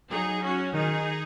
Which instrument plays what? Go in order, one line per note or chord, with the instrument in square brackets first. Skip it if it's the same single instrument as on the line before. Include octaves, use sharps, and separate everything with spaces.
[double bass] F#3 [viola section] D#4 G#4
[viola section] C#4 F#4
[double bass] D#3 [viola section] D#4 G#4